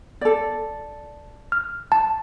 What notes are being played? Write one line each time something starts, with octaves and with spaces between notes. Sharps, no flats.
A4 D5
F6
A5